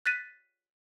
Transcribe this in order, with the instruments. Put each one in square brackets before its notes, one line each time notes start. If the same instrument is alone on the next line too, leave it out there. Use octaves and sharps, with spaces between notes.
[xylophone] F#6 A6 B6 D#7